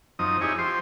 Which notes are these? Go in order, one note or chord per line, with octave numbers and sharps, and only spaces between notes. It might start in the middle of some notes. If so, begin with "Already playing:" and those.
F#2 F3 C4 D#4 D#6
D#4 E4 G4 G#4 C#5
F3 G4 C5 C6